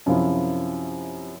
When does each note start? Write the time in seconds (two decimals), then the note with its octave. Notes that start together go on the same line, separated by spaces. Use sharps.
0.06 F#2 C3 F3 E4